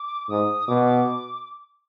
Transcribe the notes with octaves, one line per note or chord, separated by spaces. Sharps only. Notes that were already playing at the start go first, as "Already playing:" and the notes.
Already playing: D6
G#2 D#6
B2 D6